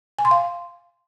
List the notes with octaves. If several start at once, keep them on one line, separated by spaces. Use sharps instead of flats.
G#5
C6
F5